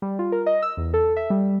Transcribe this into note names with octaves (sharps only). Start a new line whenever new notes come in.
G3
F4
A#4
D#5
E6
E2
A4
E5
G3